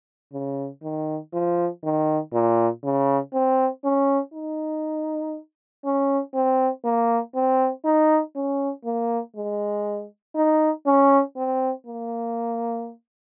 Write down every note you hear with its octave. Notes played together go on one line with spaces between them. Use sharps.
C#3
D#3
F3
D#3
A#2
C#3
C4
C#4
D#4
C#4
C4
A#3
C4
D#4
C#4
A#3
G#3
D#4
C#4
C4
A#3